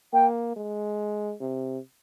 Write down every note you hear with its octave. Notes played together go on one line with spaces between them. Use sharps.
A#3 G5
G#3
C3